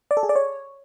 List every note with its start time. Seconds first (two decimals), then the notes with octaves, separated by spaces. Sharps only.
0.11 D5
0.17 A4
0.23 G#4
0.29 D5
0.35 C#5